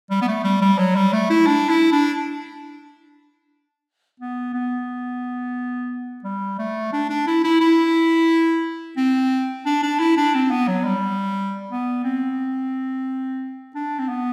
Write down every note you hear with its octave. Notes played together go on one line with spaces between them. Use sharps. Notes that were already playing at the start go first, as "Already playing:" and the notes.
G3
B3
A3
G3
G3
F#3
G3
A3
E4
D4
E4
D4
B3
B3
G3
A3
D4
D4
E4
E4
E4
C4
D4
D4
E4
D4
C4
B3
F#3
G3
B3
C4
D4
C4
B3